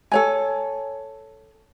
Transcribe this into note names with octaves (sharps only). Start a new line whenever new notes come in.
A4 C#5 G#5